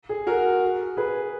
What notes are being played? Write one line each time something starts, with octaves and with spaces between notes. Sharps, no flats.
G#4
F#4 A#4
G#4 B4